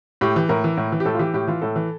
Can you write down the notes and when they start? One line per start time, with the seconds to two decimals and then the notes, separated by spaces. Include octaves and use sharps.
0.21 A2 G4
0.36 E3
0.49 A2 A#4
0.64 E3
0.77 A2
0.92 E3
1.00 G4
1.05 A2 A4
1.15 F4
1.19 E3 G4
1.34 A2 G4
1.48 E3 F4
1.62 A2 A4
1.76 E3